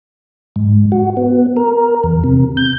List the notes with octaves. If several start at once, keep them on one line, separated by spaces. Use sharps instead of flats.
G#2
F#4
B3
A#4
E2
C3
G6